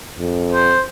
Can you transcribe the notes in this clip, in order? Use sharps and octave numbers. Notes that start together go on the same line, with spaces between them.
F2
C5